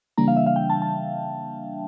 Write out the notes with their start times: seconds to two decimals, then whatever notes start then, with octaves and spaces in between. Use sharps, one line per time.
0.18 C#3 E3 G3 A#3 D4 A#5
0.28 F5
0.37 E5
0.46 F5
0.56 G5
0.70 A5
0.82 A5